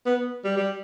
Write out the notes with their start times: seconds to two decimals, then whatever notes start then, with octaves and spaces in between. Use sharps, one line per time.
0.06 B3
0.45 G3
0.57 G3